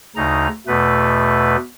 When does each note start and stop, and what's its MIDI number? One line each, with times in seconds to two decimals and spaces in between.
0.16 0.48 38
0.16 0.48 49
0.16 0.48 63
0.16 0.48 82
0.67 1.56 40
0.67 1.56 47
0.67 1.56 57
0.67 1.56 71